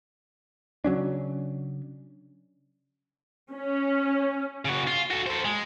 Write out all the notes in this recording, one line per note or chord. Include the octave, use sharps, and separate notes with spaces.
C#3 F#3 C#4 D4
C#4
C#3 F#4
F4
F#4 A4
A4 C5
G#3